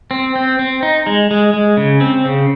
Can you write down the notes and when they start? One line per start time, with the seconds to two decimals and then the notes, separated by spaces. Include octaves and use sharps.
0.11 C4
0.36 C4
0.59 C4
0.83 D#4
1.07 G#3
1.31 G#3
1.54 G#3
1.77 C#3
2.01 C4
2.25 C#3